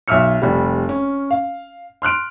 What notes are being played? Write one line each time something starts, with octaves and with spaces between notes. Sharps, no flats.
B1 E5 E6 F6 C#7
F1 G3
C#4
F5
C6 F6 F#6 D7